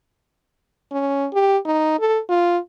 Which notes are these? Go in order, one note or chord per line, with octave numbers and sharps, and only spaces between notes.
C#4
G4
D#4
A4
F4